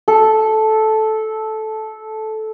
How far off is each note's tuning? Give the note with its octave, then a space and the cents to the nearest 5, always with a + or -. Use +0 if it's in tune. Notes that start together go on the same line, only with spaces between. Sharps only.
A4 -10